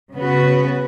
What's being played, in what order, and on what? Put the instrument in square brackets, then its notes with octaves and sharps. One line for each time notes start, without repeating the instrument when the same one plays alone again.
[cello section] C#3 B3 F#4 B4